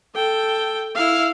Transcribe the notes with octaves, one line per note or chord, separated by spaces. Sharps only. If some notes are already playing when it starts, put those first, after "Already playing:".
A4 G5
E4 F5